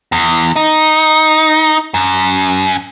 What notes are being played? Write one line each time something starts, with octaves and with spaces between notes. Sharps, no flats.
E2
D#4
F#2